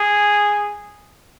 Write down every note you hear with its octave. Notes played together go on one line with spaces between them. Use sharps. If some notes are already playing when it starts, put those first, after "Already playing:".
Already playing: G#4